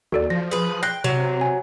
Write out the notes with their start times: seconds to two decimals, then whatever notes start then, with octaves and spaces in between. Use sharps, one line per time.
0.12 D#2 F#4 A4 D5
0.30 F3 A#6
0.51 G#4 B4
0.83 G5 F#6 A#6 C7
1.04 C3 F#3
1.41 G#5